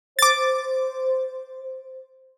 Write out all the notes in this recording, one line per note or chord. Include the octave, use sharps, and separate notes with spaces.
C5 D6 A6